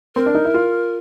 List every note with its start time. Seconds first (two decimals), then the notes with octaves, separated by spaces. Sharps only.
0.16 C4 A#4
0.26 D4
0.35 D#4
0.45 E4
0.54 F4